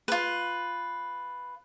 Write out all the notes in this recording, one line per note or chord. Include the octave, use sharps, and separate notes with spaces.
F4 B4